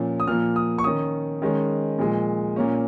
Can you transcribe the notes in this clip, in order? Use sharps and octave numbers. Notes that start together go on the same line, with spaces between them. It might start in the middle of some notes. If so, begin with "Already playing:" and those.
Already playing: A#2 F3 C#4
D#6
A#2 F3 A#3 F6
D#6
C#6
D#3 C#4 D#6
D#3 G#3 C#4
A#2 F3 G#3
A#2 A#3 C#4